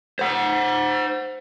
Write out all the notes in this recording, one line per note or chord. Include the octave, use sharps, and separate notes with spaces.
C5 F#5